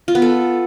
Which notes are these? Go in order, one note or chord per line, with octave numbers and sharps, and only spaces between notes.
F4
B3
A4